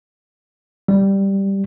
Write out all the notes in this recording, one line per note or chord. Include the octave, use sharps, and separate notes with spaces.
G3